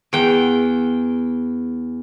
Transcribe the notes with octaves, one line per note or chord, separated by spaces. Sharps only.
E2 G5